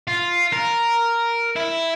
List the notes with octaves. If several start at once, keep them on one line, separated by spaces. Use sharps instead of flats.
F4
A#4
E4